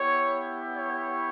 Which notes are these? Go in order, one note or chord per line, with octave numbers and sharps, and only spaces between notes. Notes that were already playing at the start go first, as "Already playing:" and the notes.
Already playing: B3 E4 G4 C#5
C#5